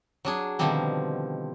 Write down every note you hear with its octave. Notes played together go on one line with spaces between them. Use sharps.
F#3 D4 G#4
B2 D3 D#3 F3 G3 C4